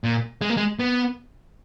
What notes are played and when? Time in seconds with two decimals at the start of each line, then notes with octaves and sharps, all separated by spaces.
0.04 A#2
0.41 G#3
0.50 A#3
0.57 G#3
0.79 B3